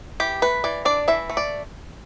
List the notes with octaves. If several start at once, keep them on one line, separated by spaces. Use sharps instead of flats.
E3 G4
A3 B4
E3 D5
D4 D5
E3 E5
A3
D5